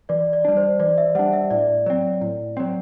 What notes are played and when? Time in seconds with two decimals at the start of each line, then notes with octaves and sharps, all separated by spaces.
0.09 E3 D5
0.33 D5
0.45 G3 D4
0.57 C5
0.80 E3 D5
0.98 E5
1.15 G3 D4 F#5
1.33 E5
1.50 A2 D5
1.86 F#3 C4
2.21 A2
2.57 F#3 C4